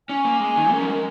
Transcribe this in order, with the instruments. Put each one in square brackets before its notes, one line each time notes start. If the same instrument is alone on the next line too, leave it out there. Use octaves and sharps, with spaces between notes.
[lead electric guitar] C#4 [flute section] G#5
[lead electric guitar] A#3
[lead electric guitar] G#3 [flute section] G#5
[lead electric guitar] D#3
[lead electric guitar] C#4 [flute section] A#4
[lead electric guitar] F#3
G#3